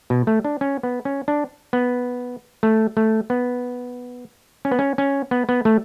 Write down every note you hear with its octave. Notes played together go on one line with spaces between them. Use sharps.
B2
A3
D4
C#4
B3
C#4
D4
B3
A3
A3
B3
C#4
B3
C#4
C#4
B3
B3
A3